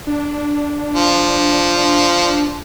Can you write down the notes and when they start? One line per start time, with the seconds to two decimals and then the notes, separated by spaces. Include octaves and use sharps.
0.07 D4
0.94 F3